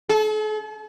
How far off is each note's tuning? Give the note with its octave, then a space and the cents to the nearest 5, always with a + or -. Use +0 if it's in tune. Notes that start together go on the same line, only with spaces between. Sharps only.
A4 -45